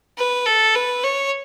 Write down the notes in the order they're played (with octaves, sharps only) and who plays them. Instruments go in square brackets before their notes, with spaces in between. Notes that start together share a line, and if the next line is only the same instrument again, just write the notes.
[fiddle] B4
A4
B4
C#5